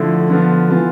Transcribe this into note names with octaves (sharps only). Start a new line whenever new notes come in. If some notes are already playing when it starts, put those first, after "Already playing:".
Already playing: D3 F3 A3 E4
D3 F3 B3 F4
E3 B3 F4